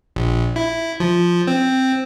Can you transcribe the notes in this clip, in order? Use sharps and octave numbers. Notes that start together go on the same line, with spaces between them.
A#1
E4
F3
C4